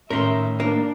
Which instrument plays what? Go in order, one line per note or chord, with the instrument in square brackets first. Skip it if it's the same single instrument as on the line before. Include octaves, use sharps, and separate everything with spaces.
[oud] A2 D#3 [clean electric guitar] C#4 B5 C6 [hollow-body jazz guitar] A#4 [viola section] E5
[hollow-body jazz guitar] A#3 [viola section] D4